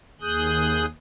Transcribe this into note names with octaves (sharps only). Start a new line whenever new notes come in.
D#2 G#4 D#6 F#6 G6